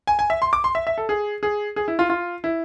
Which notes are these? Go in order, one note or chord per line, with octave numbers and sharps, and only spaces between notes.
G#5
G#5
E5
C6
D6
C6
E5
E5
A4
G#4
G#4
G#4
E4
F4
F4
E4